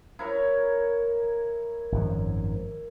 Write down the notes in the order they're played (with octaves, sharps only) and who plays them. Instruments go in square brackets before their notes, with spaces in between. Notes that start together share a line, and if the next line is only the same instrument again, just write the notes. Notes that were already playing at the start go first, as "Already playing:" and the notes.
[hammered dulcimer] E4 A#4 C#5
[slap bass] G#1 F#2 F3